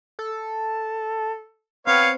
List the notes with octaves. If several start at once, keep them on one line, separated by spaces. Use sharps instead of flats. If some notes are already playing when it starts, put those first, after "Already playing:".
A4
B3 C4 C#5 F5